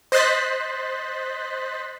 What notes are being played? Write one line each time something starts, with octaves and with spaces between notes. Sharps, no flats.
C5 D#5 C6 F#6 A6 B6